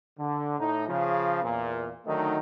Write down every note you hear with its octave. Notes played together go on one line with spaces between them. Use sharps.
D3
A2 D#4
C#3 F3
E2 A#2
D3 D#3 F#3 A3 D#4